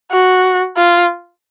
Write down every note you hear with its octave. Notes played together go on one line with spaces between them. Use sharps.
F#4
F4